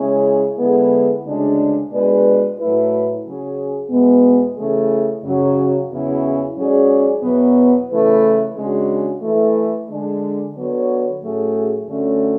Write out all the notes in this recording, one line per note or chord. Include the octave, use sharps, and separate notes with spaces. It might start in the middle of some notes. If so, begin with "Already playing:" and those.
Already playing: C#3 G#3 C#4 E4 G#4
D3 G#3 B3 E4 G#4
D2 C#3 G#3 D4 G#4
B2 G#3 D4 G#4 B4
A2 F#3 A3 E4 B4
C#3 F#3 C#4 G#4
E2 B2 G#3 B3
C#3 E3 A3 E4 G#4
F#2 C#3 F#3
E2 C#3 F#3 C#4 E4
G#2 F#3 C#4 G#4 D5
E2 B2 F#3 B3
C#3 E3 A3 E4 B4
C#3 G#3 D4 F#4
E3 A3 E4
D3 G#3 D4
D3 F#3 B3 F#4 C#5
A2 F#3 A3 C#4 G#4
F#2 D3 A3 C#4